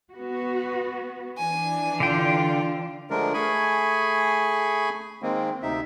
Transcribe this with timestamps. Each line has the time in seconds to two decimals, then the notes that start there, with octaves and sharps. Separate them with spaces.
0.13 B3 F#4
1.37 E3 D4 G#5
2.00 D3 F4 G5
3.10 D3 F3 G#3 A3 D4 A#4
3.34 A3 G#4 G#5 B5 C#6
5.22 D#3 G#3 A#3 C4
5.63 D2 C3 D#4 E5